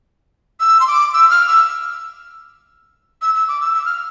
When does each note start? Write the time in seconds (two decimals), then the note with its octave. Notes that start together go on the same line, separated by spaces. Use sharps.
0.60 E6
0.80 C6
0.87 D6
1.14 E6
1.30 F6
1.48 E6
3.22 E6
3.35 E6
3.48 D6
3.61 E6
3.74 E6
3.86 F6